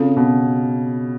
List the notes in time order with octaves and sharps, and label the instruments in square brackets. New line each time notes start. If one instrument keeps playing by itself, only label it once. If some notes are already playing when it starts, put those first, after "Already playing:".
Already playing: [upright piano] C#3 [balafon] C4 F4 A4
[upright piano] B2